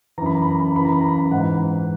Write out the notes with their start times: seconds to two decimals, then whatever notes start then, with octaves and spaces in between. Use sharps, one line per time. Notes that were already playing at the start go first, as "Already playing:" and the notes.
0.18 E3 A#5
0.21 F#2 B5
0.35 A#5
0.42 B5
0.51 A#5
0.60 B5
0.68 A#5
0.75 F#2 C#3 E3 B5
0.85 A#5
0.92 B5
1.01 A#5
1.09 B5
1.18 A#5
1.31 G#2 E3 F#5